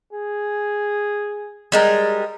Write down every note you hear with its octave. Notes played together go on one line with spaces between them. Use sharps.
G#4
G3 G#3 A#4